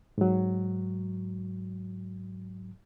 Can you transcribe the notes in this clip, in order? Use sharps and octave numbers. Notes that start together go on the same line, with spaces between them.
G#2 F#3